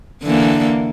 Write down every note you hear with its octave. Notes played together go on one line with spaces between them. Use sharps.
D3 E3 A#3